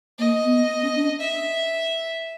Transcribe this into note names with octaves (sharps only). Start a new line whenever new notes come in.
A#3 D#5
B3
C#4
D4
E5